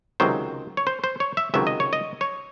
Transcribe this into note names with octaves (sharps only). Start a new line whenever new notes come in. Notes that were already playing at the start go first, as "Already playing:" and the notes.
C#2 C3 D#3 F#3 C5
C#5
C5
C5
C#5
E5
C#2 C3 D#3 F#3 E5
D#5
C#5
D#5
C#5